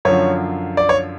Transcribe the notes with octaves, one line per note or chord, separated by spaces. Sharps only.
F#2 D3 F3 C#5
D5
C#5